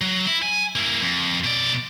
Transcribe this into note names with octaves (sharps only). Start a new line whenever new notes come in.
F#3
E4
G#5
A#3 E4
F2
B2 D5